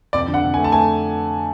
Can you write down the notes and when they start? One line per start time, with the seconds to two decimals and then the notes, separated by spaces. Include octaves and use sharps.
0.13 F2 D5
0.28 D3
0.34 F#5
0.43 F2
0.54 G#5
0.58 A3
0.64 A5
0.72 A3 G#5